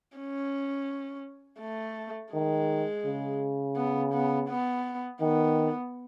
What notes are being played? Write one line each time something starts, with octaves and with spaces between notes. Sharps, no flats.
C#4
A3
D#3 G#3
C#3
B3
B3
B3
D#3 B3